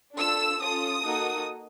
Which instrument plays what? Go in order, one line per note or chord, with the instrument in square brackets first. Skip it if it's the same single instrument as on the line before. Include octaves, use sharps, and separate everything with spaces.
[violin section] D4 F4 A4 E6
C#4 F4 A4 D#6
A#3 D#4 F#4 A4